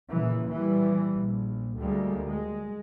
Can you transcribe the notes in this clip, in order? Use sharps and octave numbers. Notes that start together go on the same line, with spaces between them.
A#2 C#3 E3
E3 G3
A#1
D2 G3 G#3 A#3
G#3